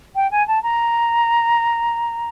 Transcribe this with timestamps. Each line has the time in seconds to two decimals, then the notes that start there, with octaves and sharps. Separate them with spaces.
0.15 G5
0.31 G#5
0.47 A5
0.63 A#5